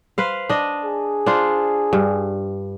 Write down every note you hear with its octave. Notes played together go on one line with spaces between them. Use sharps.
B4 C5 F5
D4 D#5
G#4
D4 F4 C5
G2